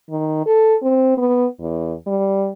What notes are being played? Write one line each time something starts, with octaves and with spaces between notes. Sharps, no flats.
D#3
A4
C4
B3
E2
G3